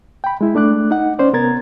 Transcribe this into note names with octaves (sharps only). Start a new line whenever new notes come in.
G5 B5
G#3 E4
A3 D4 D6 F#6
D#4 F#5
C#4 C5 D5
C3 B3 A#4 A#5 G#6 A6